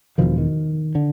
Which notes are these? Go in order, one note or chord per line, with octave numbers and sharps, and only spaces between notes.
E1 E2 B2 D#3 F3
D#3
D3